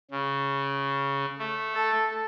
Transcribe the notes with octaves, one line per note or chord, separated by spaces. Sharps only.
C#3
A3
A4